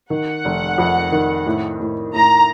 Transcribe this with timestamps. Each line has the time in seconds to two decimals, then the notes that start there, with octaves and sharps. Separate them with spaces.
0.10 D#3 F#5
0.45 F1
0.78 F2
1.12 D#3
1.46 A2
1.80 A2
2.14 A2 A#5